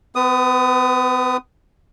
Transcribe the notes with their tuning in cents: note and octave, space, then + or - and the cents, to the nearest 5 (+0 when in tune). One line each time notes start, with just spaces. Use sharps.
B3 +45 B4 -5 D#6 +0